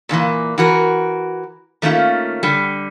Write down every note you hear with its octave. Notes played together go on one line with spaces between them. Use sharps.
A#2 D3 E3 A#3
E3 F#4 A#4
D#3 A3 A#3 C#4 F4
D3 G3